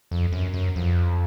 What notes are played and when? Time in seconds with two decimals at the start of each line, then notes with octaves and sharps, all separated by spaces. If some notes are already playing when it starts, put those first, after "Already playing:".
0.11 F2
0.33 F#2
0.54 F#2
0.76 F2